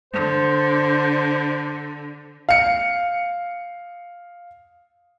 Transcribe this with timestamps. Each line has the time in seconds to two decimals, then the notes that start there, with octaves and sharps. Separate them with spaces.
0.13 D3 C5
2.49 F5 C#7